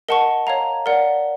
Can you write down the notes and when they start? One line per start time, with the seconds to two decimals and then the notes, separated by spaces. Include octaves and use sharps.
0.09 A#4 D#5 F#5 A5 C#6
0.47 C#5 F5 A#5
0.86 A#4 D5 F#5